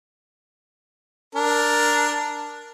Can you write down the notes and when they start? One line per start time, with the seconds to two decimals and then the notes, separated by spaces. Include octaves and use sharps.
1.35 D4 A#4